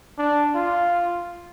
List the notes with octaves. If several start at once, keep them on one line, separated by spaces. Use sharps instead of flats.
D4
F4